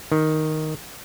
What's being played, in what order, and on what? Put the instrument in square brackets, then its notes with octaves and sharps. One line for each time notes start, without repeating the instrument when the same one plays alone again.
[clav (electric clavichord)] D#3